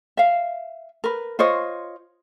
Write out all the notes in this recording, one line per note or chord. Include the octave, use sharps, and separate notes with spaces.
E5 F5
A#4 B4
F4 C5 C#5 D#5